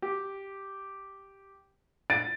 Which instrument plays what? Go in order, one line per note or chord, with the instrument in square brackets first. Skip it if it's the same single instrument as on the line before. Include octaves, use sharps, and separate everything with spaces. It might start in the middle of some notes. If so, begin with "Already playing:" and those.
[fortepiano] G4
[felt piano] A6 D7